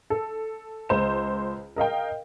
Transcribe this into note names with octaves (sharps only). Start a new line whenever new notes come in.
A4
C#2 C5 E7
A#4 D#5 F5 G5